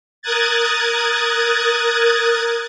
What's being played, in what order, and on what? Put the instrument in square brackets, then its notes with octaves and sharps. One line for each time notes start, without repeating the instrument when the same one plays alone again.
[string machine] A#4 D#6 F#6 G#6 A6